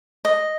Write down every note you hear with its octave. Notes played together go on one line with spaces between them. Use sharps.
D#5